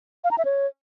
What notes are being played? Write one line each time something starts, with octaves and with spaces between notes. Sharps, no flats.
F5
A#5
E5
C#5